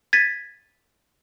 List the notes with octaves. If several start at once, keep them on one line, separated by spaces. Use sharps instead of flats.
G#6 A6 B6 D#7